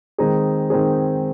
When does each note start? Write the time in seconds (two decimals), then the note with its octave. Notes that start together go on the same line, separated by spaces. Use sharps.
0.18 D#3 G#3 C4 D#4 G#4
0.70 D#3 G#3 C4 D#4 G#4